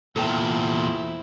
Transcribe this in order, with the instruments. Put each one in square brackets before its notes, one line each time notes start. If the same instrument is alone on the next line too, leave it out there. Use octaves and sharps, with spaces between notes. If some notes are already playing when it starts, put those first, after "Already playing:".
[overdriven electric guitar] E2 A#2 [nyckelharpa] E4 C5 [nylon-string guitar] A4 G5